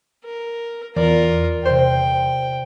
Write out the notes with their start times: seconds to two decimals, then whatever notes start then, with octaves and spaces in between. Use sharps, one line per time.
0.25 A#4
0.96 E2 F4 A#4 D5
1.65 C3 C5 G5